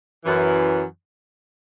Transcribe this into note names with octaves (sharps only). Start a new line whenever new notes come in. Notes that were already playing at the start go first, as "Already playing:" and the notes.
F#2 E3